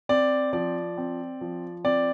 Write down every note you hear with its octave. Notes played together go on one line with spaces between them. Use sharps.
C4 D5
F3 D5
C4
F3
C4 D5